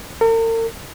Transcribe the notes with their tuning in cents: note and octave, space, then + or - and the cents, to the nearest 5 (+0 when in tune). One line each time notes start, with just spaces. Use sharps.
A#4 -45